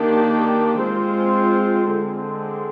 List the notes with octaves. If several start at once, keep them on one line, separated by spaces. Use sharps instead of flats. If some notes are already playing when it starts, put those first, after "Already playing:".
Already playing: D#3 A#3 D4 G4
G#3 C4 F4 C5
D3 G#3 C4